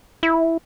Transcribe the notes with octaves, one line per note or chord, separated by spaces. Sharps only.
E4